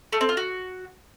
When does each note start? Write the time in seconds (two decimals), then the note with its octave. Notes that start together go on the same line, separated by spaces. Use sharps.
0.12 A3
0.21 C4
0.29 F4
0.37 F#4